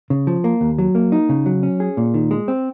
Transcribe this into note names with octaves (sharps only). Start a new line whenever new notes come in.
C#3
F3
A#3
D#2
F#3
A#3
D#4
C#3
F#3
C#4
G#4
A#2
D#3
G#3
C4